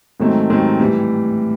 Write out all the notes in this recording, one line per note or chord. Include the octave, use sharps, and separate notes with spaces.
G#2 D#3 F#3 A3 C4
G#2 D#3 F#3 A3 C4
A2 E3 G3